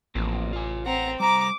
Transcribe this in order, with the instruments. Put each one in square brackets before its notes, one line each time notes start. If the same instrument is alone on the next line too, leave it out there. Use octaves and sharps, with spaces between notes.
[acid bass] A1 [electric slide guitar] F3 A#3 C4
[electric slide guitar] F4 G#5
[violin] C4 A#5 [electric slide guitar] F#5
[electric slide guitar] G3 C5 [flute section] A#5 [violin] D6